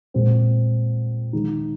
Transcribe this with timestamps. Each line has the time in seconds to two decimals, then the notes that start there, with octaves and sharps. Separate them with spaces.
0.14 A#2 G#3 C4
1.33 D#3 G#3 D#4